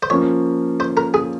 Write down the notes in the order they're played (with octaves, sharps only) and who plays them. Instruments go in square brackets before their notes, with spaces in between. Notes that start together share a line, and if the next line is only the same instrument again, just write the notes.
[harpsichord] C5
[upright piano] F3 A#3 C#4 [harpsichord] C#5
[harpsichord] C5
A#4
G#4